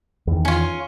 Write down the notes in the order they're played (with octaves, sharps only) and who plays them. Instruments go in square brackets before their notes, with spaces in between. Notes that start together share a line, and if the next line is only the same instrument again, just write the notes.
[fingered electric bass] E2 D#3
[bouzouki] C#4 F4